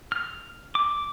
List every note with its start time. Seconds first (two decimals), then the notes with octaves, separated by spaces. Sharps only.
0.12 F6
0.75 D6